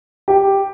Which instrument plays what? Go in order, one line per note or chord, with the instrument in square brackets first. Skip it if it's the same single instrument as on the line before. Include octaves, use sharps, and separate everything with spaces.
[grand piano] G4